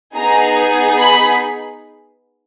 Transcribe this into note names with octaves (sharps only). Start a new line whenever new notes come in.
B3 D#4 G#4 A#5
B5